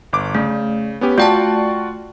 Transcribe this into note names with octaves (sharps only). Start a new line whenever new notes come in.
G1 D6
C#3 A3
B3 C#4 G4
A3 F4 F#4 D5 G5 A5